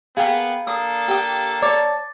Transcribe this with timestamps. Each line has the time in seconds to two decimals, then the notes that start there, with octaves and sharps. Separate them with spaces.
0.17 A#3 B3 G#4 F5 G5
0.67 A#3 D4 A4 D#6
1.08 G4 G5 D#6
1.62 C#5 D5 A5 D6 A6